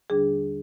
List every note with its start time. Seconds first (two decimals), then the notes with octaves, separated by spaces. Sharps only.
0.10 D#2 D3 G3 D4 G#4